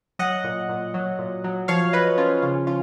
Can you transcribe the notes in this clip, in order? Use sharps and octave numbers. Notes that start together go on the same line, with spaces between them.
F#3 D#5 F#5
A#2
A#2
F#3
A#2
F#3
F3 C#5 F5
F3 B4 D#5
F3 C#4 F4
C#3 C#4 F4
F3 C#4 F4